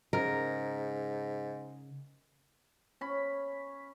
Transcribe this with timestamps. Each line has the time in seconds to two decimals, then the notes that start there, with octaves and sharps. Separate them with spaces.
0.13 G#2 C#3 A#4
3.01 C#4 B5